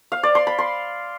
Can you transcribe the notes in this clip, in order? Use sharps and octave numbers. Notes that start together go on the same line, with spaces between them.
F5
D5
C6
B5
C6